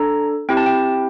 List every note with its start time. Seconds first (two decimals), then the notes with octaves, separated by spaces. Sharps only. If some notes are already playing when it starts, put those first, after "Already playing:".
Already playing: D4 A4 A#5
0.49 C4 E4 G4 G5
0.57 A5
0.66 G5